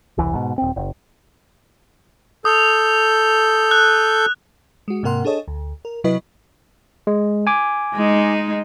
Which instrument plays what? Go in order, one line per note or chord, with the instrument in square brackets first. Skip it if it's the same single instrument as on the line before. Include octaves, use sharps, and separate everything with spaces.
[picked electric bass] E1 C2 E3
G#2 B2
D#1 C4
F#1
[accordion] A4 G6 [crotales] D#6
[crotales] F#6
[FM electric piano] G#3 F#4
G#2 C3 A#3 A#4 F#5 C6
D4 G#4 A4 C#5 D#5
D2
A#4
C3 F#3 E4 B4 D#5
[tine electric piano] G#3
G#5 D6
[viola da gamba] G#3 D#4